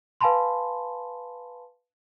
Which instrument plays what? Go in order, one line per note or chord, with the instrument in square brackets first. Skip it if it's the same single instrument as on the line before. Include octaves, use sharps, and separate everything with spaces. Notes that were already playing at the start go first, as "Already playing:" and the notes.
[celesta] B4 F5 G#5 A5 B5 C6